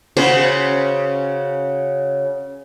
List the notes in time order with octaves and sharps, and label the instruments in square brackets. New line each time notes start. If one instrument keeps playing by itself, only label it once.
[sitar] C#3 C#4 F#4 [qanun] C5